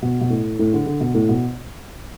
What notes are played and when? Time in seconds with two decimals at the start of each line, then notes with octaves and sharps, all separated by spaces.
0.02 B2
0.21 B2
0.30 A2
0.59 A2
0.73 D3
0.86 D3
1.01 B2
1.14 A2
1.29 B2